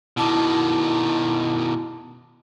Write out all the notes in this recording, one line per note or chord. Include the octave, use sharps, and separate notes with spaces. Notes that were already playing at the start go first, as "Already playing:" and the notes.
B2 D#3 E4 A5 D6